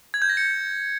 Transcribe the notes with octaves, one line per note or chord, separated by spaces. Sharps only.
G#6
G6
A#6
C#7